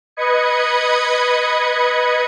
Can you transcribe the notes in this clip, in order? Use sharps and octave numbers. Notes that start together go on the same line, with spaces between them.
B4 D#5 B5 D#6 G#6 C#7